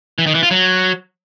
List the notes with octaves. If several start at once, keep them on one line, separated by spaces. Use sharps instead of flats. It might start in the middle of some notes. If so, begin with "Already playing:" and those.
E3
D#3
E3
F4
F#3